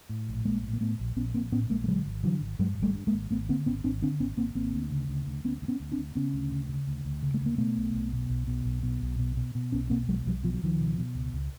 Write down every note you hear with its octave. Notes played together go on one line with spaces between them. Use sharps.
A2
A#1
A#1 G#3 A#3
A2
A#3
A2 A3 B3
A#1
A#1 B3 C#4
A#1 A#3 C4
A2 B3 C#4
A#1 G#3 A#3
A3
D3 F#3 G#3
G#1
D3 E3 F#3
G#1
G2 F#3 G#3
G#1 G3 A3
G2
G#3 A#3
G#1
G#1 A3 B3
D3 A#3 C4
G#1 B3 C#4
G#1 C4 D4
D3 C4 D4
G#1 B3 C#4
G#1 A#3 C4
G#1 A#3 C4
D2
C#3
D2
D2
D2 B3 C#4
D2
B3 C#4
D2
C4 D4
D2
C#3 B3 C#4
D2
C#3
C#3
D2
D2
C#3
A3
D2
A#3
B2 A3 B3
B1
B1
B2
B1
B2
B1
B2
B1
B2
B2
B2
B1 B3 C#4
B2 A#3 C4
B1 F#3 G#3
B1 F3 G3
B2 F3
F#3
C#2 D#3 F3
B2
B2
C#2
C#2